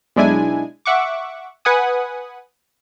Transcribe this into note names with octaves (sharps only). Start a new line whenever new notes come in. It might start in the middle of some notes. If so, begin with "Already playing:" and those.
B1 G#3 D4 E4 G#5
E5 F#5 C#6 D6
B4 F#5 G#5 D#6